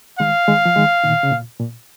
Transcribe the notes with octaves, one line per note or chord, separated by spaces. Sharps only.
D#3 G#3 F5
D#3 G#3
F3
D#3 G#3
A#2 D#3
C#3
A#2
A#2